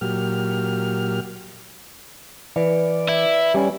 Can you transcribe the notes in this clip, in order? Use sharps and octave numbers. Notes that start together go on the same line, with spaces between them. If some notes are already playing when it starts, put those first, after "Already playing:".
A#2 F#3 G4 F6
E3 B4 D5
E4
G3 C#4 D5 G#5